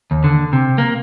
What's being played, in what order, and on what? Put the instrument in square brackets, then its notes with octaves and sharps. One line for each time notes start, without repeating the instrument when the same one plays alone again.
[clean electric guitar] D#2
D3
C3
A#3